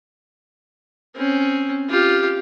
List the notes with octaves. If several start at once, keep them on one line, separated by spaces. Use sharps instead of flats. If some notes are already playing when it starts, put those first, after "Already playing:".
C4 C#4
F4 G4